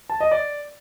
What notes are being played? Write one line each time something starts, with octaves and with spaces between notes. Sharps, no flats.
A5
D#5
D5